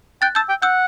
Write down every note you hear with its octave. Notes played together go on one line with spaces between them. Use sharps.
G5 F#6 A6
A5 E6 G6
G5
F#5 E6 G6